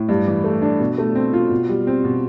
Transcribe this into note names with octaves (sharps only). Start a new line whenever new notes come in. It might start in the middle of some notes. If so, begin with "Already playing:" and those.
Already playing: A2
G2
E3
A3
D4
B2
A3
C4
F4
B2
G3
C4
B2